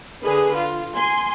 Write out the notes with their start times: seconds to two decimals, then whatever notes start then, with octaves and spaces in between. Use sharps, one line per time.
0.24 D3 G#4 B4
0.56 F4
0.95 G#5 C6